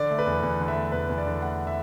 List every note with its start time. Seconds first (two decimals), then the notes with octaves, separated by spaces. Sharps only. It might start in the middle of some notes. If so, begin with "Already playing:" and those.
Already playing: D3 D5
0.10 A3
0.19 B4
0.27 E2
0.43 E2
0.60 D3
0.68 E5
0.76 A3
0.92 E2 B4
1.09 E2
1.18 D5
1.26 D3
1.42 A3 F#5
1.67 E5